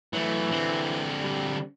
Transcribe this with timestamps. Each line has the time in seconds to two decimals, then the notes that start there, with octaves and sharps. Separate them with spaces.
0.14 E3 F#3 A3
0.51 D3 C4
1.21 G3